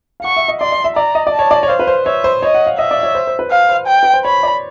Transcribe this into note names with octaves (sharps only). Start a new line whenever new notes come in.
F5
F#5 C#6
E5
D#5
D5 C6
D5
E5
D5 A#5
D#5
D5
A5
C#5
D5
C#5
C5 F5
B4
C5
C#5 E5
C5
C#5 D#5
F#5
F5
D#5 E5
D5
C#5
C5
C5
B4
C5 F5
C5
G5
B4
C5
C#5 B5
D5